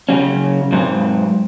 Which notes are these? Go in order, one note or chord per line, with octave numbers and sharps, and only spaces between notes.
C#3 F#3 C#4
G#2 F#3 C4